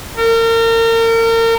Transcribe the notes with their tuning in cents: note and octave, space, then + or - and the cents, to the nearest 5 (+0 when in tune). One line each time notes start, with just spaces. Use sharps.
A#4 -35